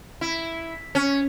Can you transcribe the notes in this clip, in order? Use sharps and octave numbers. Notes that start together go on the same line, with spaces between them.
E4
C#4